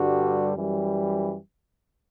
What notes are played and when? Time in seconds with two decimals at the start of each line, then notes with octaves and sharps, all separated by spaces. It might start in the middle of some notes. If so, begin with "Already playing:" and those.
Already playing: G2 D3 G3 F#4
0.56 F#2 E3 G3